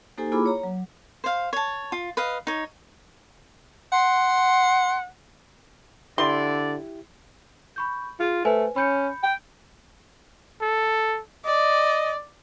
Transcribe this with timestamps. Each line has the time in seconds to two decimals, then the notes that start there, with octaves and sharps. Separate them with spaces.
0.18 A#3 D#4 G4 A4 C5 G#5
0.32 A#3 E4 F4 G#4 B5 D6
0.46 C#5 A#5
0.64 F#3
1.24 C5 F5
1.53 C#5 A5
1.92 F4
2.17 B4 D#5 F5
2.47 D#4 C#5
3.92 F#5 C6
6.18 D3 E4 G4 D5 C6
7.76 B5 C#6 G6
8.20 F4 G#4
8.45 A3 B4 C5 G#5
8.76 C#4 B5 G6 C#7
9.23 G5
10.62 A4
11.45 D5 D#5